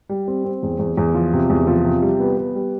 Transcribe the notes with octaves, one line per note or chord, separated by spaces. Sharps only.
G3
C4
C4
E2
E2
E2
F3
C3
E2
F3
C3
G3
B3
B3
G3